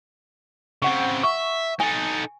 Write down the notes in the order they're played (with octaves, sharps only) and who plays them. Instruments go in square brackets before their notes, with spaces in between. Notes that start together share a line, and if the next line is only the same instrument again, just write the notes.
[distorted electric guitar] C#3 C4 [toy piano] F#5 C#6
[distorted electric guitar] E5 [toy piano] C#6
[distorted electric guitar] D#4 A4 [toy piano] G#5